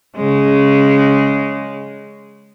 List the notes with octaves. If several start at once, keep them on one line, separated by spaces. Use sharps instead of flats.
C#3 G#3